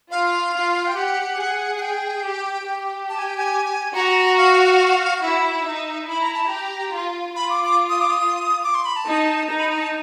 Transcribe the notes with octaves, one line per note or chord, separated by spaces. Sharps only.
F4 F5
F4
G5
G4 F#5
G#4
F#5
G5
G4
G4
A5
G#5
G5
G#5
F#4 A#5
F5
E4 E5
D#4
E4 B5
A#5
A5
G4 A#5
F4
F4 B5
D6
D6
D#6
D6
D#6
D6
C6
B5
A5
D#4
D#4 A#5
B5
A#5
A5